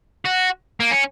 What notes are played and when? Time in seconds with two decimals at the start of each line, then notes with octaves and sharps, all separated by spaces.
0.25 F#4
0.80 A#3
0.91 C#4